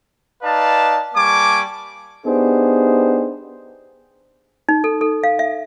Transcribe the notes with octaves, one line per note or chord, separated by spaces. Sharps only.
D#4 B4 D5 F5 A5
G3 A#3 G#5 A5 C#6 D6
B3 D4 D#4 G4 G#4 C5
D#4
A4
A4
F5
E5